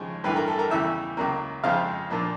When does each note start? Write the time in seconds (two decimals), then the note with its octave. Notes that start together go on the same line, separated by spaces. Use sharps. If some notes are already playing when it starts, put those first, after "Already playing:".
Already playing: D#2 C#3 F3 G#3
0.24 A1 G2 E3 A3 B4
0.36 A#4
0.47 A4
0.59 A#4
0.70 E2 C#3 E3 G3 E5
1.17 C#2 C#3 F#3 A#3
1.64 F2 C#3 F3 G#3 C4 F5
2.10 A#2 F3 A#3 D4